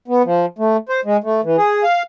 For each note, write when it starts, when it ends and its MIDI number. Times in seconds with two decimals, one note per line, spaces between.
0.08 0.22 59
0.25 0.46 53
0.58 0.77 57
0.89 1.00 72
1.05 1.17 56
1.24 1.41 57
1.44 1.56 52
1.57 1.83 68
1.83 2.02 77